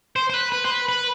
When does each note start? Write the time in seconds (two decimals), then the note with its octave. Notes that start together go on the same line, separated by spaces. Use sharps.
0.16 C5
0.30 C5
0.34 B4
0.52 B4
0.65 C5
0.70 B4
0.89 B4